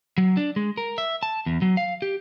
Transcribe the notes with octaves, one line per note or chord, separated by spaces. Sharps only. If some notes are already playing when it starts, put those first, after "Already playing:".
F#3
D4
G#3
A#4
E5
A5
E2
F#3
F5
G4